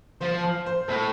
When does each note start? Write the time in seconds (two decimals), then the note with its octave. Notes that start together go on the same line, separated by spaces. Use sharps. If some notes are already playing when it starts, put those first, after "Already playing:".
0.21 F3 C5
0.43 F5
0.66 C5
0.88 A2 A4